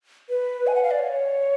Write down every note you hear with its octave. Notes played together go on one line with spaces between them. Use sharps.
B4
G#5
F#5
F5
D5
C#5